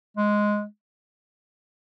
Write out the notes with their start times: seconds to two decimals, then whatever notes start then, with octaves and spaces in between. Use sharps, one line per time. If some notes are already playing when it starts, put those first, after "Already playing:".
0.17 G#3